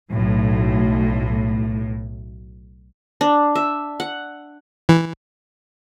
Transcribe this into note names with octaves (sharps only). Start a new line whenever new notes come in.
B1 A2
D4
E5
F#5
E3